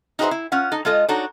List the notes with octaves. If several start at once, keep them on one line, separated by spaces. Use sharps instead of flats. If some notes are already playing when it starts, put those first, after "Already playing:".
D#4 F#4 G#4 B4 C5 E5
E4
C#4 F4 F#5
D#4 A4
G#3 F4 A4 D#5
D4 D#4 F#4 A4 C#5